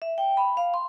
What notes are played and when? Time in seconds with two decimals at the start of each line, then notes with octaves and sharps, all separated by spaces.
0.02 E5
0.18 G5
0.37 B5
0.57 F5
0.74 C6